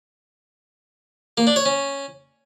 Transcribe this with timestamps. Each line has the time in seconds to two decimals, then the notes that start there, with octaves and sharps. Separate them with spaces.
1.38 A#3
1.47 D4
1.56 C#5
1.65 C#4